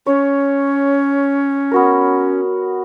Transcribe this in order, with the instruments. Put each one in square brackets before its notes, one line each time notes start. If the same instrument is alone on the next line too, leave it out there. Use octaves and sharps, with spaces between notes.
[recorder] C#4 [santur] C#5
[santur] B3 F#4 A#4